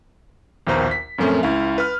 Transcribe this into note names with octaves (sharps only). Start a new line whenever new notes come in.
A#1 D#2 B2 C5 A#5
B6
F#2 A#2 F3 A3 C4 C#4
C#2 E4 F5
B4 F6